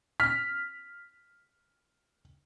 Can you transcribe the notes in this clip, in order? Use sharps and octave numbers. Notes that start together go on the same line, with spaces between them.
F6 B6